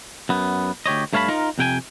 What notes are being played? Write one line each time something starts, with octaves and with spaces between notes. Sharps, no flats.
F#2 B3
D2 G4 C#5 D#5
G2 A3 C#5 F5 A5 B5
D#4 F4 A#4
F2 C3 G5 G#5